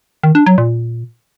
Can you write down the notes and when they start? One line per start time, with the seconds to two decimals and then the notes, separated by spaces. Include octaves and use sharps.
0.23 D#3
0.35 D4
0.46 F#3
0.58 A#2